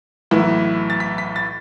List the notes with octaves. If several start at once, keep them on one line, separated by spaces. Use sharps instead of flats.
B1 A2 E3 B3 E4
A6
B6
B6
A6